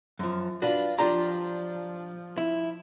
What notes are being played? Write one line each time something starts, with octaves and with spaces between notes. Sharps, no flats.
F#2 F3
D4 F4 F#4 B4
F3 D4 F4 G4 C5 A#5
E4